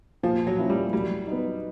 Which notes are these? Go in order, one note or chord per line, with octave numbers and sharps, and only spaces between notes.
A#2 F3
F#3
F3 A#3 C#4 E4
G3
F#3 G3
B3 D#4